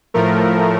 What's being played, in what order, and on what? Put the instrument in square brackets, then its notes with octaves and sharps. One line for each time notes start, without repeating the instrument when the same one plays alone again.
[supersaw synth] A2 F3 A3 A#4